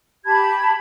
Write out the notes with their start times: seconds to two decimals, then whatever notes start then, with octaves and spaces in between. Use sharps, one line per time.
0.25 G4 A5 B5 G#6